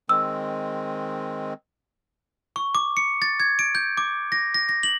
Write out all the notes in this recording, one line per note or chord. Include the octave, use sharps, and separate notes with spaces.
D#3 G#3 C4 E6
C#6
D6
C#7
A6
G#6
D7
G6
D6
A#6
A#6
A#6
F#7